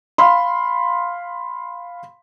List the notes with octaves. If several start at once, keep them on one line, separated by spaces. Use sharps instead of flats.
F5 B5 C6